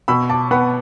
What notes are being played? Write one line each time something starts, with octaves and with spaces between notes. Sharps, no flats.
B2 B5 E6
A5 D6
B3 F#5 B5